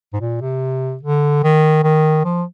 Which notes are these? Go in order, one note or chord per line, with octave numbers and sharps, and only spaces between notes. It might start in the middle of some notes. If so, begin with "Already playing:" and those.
G#2
A#2
C3
D3
D#3
D#3
F3